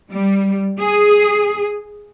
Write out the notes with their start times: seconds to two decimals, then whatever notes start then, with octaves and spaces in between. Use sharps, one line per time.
0.10 G3
0.79 G#4